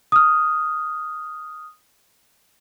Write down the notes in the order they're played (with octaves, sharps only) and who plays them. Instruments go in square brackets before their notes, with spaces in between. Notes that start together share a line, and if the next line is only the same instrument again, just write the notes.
[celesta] D#6 F6